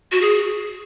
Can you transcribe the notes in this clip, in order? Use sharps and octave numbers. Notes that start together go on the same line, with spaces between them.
F#4
G#4